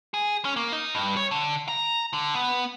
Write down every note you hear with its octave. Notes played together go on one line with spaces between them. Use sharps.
G#4
C#4
A#3
D#4
G2
C#5
D3
A#5
D3
B3